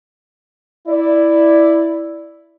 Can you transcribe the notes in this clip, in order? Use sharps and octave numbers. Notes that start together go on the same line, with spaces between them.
E4 D5